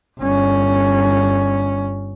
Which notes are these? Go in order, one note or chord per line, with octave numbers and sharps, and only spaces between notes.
G1 C#4